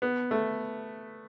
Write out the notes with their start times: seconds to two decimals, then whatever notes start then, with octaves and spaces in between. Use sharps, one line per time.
0.02 B3
0.31 A3